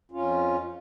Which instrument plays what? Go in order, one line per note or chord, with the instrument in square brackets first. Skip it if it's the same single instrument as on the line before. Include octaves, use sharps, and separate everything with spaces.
[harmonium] F2 C#4 F4